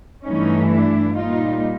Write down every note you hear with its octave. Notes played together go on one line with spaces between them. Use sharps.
G2 E3 A3 C#4 D#4
D4 E4
A#2 G3 D#4 F4